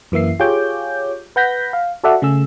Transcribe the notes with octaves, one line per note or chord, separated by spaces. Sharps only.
F#2 E3 A#3 E5 C7
F4 G4 G#4 C#5 D6 G6
B4 F#5 G6 A#6 B6
F5
F#4 A4 D5 E5 F#5
C#3 A3 G#4 E6